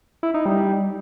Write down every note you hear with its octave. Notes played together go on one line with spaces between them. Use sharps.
E4
D#4
G3
G3